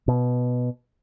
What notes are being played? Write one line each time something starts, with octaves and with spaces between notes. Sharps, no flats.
B2